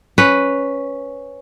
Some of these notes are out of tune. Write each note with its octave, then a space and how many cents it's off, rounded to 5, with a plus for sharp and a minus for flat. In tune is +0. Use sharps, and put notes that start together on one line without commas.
C#4 +0 B4 +0